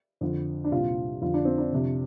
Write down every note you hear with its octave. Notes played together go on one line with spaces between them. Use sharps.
F2 D3
D4
C2 A#2 F4
F2 D3 F4
D4
C4
D4
F2 C3